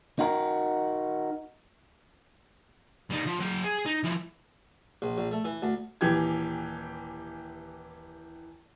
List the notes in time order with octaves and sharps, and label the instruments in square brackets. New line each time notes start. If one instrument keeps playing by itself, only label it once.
[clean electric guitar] D#4 F#4 A#4
[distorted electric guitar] G3 D#4
F3
F#3 G5
G#4
D#4
F3 E4
[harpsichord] A#1
A#1
A3
E3
D2
[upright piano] D#1 E3 G4 G#6